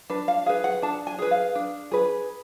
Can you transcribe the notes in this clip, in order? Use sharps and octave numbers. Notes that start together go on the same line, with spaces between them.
D4 B4
F5
G#4 B4 F5
F#5
D4 A5
G#5
G#4 B4
F5
D4
G#4 B4